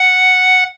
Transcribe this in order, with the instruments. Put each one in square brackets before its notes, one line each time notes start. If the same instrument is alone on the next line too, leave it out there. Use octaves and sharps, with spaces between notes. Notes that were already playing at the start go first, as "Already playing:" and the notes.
Already playing: [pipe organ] F#5